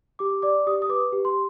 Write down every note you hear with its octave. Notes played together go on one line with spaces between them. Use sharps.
G4 D6
D5 D6
G4 D#6
D#6
B4 D6
G4
C6